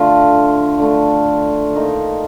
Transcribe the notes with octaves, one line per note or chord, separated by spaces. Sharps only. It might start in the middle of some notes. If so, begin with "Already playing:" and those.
Already playing: D3 A3 D4 F4
D3 A3 D4
D#3 A#3 D#4 A4